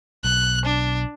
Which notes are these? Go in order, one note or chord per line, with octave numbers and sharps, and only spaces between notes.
B1 F#6
D4